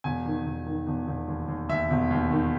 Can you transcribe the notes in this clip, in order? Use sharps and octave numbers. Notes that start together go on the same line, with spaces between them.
E1 G#5
D#3
E1
D#3
E1
E1
D#2
D#2
D#2 E5
E1
D#2
D#3